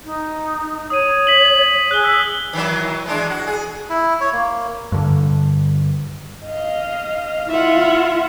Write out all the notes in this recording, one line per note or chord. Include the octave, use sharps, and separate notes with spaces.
D#4
C#5 D#6 D#7
B6 F#7
G#4 F#6 G7
E6 B6
D#3 E3 F#3
E3 G#3 D4
F#4
G#4
E4
C#5
A#3
G2 D3
D#5 F5
E4 F4 E5 F#5